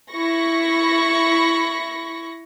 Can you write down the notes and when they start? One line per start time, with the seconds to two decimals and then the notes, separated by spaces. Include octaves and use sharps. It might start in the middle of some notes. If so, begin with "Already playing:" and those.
0.10 E4 B5 C#6 A#6